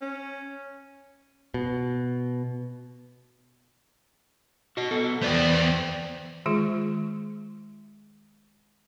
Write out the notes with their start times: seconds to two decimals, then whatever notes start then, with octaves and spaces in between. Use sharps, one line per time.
0.01 C#4
1.54 B2
4.77 F#4 D#5
4.91 B3 A4
5.22 E2 B3 C5 D5 G5
6.46 D#3 G#3 F4 G#4